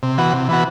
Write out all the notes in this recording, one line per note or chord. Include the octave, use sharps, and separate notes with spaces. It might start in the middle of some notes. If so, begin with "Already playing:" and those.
C3
E3 B3 F#4
C3
E3 B3 F#4